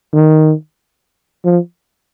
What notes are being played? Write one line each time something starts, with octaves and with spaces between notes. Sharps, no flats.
D#3
F3